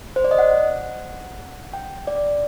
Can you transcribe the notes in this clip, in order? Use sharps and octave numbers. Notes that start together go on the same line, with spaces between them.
C5
D5
D#5
F#5
G5
D5